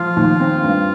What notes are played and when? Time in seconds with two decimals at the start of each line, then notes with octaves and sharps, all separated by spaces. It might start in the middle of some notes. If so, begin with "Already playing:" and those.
Already playing: F3 F4
0.17 D#2
0.40 C4
0.63 G2